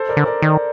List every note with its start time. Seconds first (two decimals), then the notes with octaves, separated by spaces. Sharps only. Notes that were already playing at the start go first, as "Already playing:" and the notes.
Already playing: A4 C5
0.09 A#4 D5
0.17 D3
0.25 A#4 D5
0.42 D#3